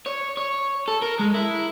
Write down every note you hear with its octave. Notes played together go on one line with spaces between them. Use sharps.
C#5
C#5
A4
A#4
G#3
E4